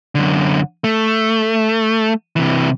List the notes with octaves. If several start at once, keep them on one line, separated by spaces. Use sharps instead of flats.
F#2 D3
A3
C3 E3